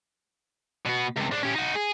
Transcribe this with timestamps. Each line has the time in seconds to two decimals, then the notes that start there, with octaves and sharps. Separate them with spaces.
0.86 B2 B3
1.17 C#2 C3
1.31 G#2 D4
1.43 C#4 G4
1.55 D#4 F#4
1.75 G#4